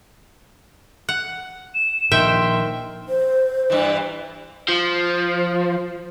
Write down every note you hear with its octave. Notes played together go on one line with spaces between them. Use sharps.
F#5
E7
A#2 D#3 F3 E5 G5 C6
C5
G2 E3
F3